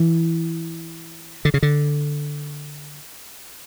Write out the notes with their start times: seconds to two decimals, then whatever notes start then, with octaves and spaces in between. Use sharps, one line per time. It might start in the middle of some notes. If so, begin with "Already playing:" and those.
Already playing: E3
1.45 D3
1.54 C#3
1.63 D3